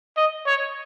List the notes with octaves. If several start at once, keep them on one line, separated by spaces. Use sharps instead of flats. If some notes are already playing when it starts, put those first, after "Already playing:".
D#5
C#5